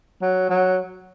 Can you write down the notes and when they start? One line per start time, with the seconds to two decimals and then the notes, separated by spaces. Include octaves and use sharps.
0.22 F#3
0.50 F#3